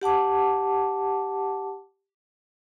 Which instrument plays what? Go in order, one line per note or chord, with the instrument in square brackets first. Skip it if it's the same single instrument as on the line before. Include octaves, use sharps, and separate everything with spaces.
[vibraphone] G4 F#5 A5 D6